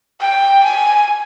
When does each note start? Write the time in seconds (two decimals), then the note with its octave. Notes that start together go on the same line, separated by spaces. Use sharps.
0.21 G5
0.64 G#5